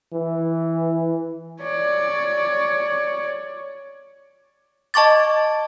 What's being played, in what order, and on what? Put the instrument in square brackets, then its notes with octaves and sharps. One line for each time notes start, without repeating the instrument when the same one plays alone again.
[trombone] E3
[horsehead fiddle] C#5 D5
[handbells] D#5 A5 C#6 D6 A6